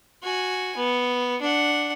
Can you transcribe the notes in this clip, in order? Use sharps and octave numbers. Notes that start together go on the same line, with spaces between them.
F#4 G#5
B3
D4 F#5